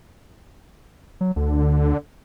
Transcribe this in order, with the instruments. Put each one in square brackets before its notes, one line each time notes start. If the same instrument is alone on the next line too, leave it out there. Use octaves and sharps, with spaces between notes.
[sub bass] F#3
[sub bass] D2 [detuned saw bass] D3